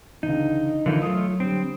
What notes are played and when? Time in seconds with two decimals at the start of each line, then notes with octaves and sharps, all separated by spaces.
0.23 C#2 D3 E3 D#4
0.86 D3 E3 F3 D#4 E4 A#4
1.02 F#3 A3 F4 D#6
1.40 D3 G3 C4